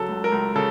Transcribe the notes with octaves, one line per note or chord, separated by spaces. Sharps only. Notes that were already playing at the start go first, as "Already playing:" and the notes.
Already playing: C#3 F#3 A4
C#2
A#4
C#2
C#3 A4